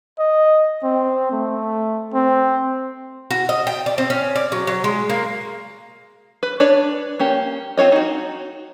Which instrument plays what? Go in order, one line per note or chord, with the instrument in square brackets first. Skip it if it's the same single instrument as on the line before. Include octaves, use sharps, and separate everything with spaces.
[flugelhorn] D#5
C4
A3
C4
[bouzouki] F#4
D#5
G5
D5
C4
C#4
D5
F#3
F#3
G#3
A#3
[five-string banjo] B4
D4 B4 C#5 D5
A#3 C#4 G4
C4 F4 C#5 D#5
D#4 F#4